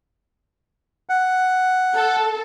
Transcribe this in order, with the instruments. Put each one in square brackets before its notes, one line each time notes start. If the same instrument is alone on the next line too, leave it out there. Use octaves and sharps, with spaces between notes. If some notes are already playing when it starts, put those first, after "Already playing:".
[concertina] F#5
[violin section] A4